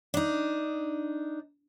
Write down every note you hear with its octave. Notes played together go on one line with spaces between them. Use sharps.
D4 D#4